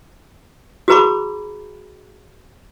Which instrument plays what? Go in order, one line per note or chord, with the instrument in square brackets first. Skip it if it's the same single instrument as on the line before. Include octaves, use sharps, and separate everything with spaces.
[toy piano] F#4 G#4 B4 A#5 B5 D6